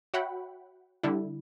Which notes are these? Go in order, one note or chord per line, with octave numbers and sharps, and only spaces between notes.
F#4 C#5 E5 F#5 G5 B5
D3 G3 D4 E4